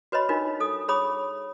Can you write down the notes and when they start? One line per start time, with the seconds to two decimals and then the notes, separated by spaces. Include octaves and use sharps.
0.12 F#4 B4 C#5 D#5 B5
0.29 D4 D#4 F4 A#4
0.60 A4 D#6
0.88 G#4 C#5 B5 D#6